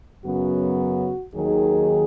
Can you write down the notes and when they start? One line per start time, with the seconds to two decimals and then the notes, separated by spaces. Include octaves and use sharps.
0.24 F#2 C#3 F#3 B3 F#4
1.34 D#2 D#3 F#3 G#4